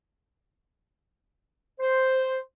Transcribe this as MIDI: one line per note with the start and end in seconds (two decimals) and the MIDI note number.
1.80 2.40 72